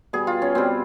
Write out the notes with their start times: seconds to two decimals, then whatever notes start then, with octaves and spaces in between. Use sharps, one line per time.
0.13 B2 G3 G#4
0.27 F4
0.42 C#4
0.55 B2 G3 C4